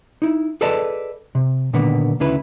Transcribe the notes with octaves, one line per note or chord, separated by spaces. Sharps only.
D#4 E4
G#4 A4 B4 D5 D#5 A5
C3
A#2 D3 D#3 A#3 B3
D2 C#3 E4 B4